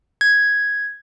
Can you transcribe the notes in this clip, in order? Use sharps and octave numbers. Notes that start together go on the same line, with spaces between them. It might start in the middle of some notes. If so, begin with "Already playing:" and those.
G#6